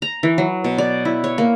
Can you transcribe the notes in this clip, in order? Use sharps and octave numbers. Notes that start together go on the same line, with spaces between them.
A#5
E3
F#3
B2
D5
E4
C#5
A#3